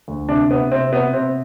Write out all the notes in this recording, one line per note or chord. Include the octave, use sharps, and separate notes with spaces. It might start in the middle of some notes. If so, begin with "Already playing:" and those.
D2
C3 D4
C3 B3
C3 C4
C3 B3
C3 C4